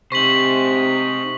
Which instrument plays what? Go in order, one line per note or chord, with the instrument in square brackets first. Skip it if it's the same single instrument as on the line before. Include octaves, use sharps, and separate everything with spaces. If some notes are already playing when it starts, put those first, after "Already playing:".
[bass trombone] C3 [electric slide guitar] D#4 C5 [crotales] C#6 B6 F#7